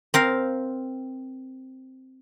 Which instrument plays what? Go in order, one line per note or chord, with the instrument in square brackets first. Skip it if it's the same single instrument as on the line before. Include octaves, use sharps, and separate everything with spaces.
[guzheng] C4 A#4 F5